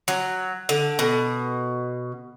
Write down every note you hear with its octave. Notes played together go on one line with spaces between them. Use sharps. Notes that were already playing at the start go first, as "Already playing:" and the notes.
F#3
D3
B2